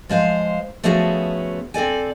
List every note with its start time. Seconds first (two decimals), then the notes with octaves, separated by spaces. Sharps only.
0.09 F3 G#3 C5 F5
0.83 F3 A3 B3 C#4 F#4 G#4
1.74 C4 A4 D5 G#5